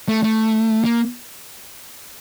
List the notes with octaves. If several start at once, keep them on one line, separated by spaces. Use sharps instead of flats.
A3
A3
A#3